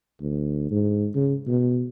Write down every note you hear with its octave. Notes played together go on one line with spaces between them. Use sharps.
D2
G#2
C#3
B2